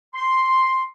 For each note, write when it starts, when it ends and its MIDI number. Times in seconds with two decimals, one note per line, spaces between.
0.14 0.83 84